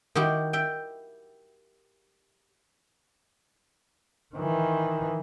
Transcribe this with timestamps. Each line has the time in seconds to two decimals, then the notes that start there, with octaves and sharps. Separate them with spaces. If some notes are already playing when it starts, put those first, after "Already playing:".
0.15 D#3 E4 F#4 G4
0.53 E5 G5
4.35 D#3 E3